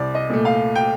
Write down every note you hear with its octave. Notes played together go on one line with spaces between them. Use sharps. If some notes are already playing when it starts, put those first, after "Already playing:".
Already playing: C2 D5
D#5
A#2 A3
F5
G5